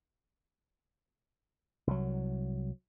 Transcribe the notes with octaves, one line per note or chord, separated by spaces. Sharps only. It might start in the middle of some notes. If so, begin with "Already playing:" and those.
C2 F#3